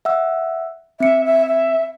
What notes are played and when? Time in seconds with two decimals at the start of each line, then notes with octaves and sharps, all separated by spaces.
0.05 E5 F#5 E6
1.00 C4 E5 C#7
1.25 E5
1.46 E5